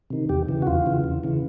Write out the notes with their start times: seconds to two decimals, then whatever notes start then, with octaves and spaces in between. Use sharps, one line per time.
0.10 C3 D#3
0.29 E2 G4
0.48 C#3 E3
0.62 F#4
0.67 E2 F4
0.86 C#3 E3
1.04 E2
1.24 C#3 E3